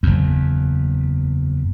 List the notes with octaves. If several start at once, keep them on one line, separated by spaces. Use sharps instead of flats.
F#1 E2